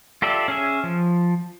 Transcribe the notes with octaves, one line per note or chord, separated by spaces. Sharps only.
F4 G4 A4 D5 E5
C#4 G#4 E5
F3